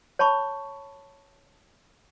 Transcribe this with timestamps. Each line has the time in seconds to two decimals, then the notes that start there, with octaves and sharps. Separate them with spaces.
0.19 C#5 A5 B5 C#6